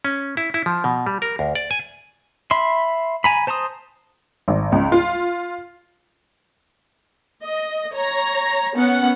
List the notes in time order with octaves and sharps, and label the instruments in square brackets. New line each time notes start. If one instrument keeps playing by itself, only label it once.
[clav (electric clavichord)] C#4
E4
E4
F3
B2
G3
A#4
D2
D5
G#5
[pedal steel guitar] E5 B5 C6
G#5 A#5 B5
C5 A5 A#5 C6 D#6
[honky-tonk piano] G#1
C#2
F4
[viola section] D#5
C#5 A#5
B3 C#4 F#5